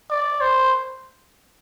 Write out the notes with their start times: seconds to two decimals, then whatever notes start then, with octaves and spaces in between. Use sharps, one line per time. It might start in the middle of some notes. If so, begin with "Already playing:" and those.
0.10 D5
0.41 C5